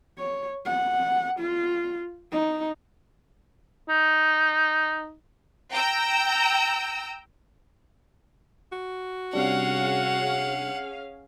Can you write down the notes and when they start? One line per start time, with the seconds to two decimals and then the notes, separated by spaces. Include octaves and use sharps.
0.18 C#5
0.65 F#5
1.39 F4
2.31 D#4
3.89 D#4
5.73 G5 A#5 E6
8.72 F#4
9.33 C3 G3 C#4 D4 G#4 F5 F#5